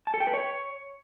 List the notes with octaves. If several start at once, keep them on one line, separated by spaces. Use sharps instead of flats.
A5
A4
G5
B4
C#5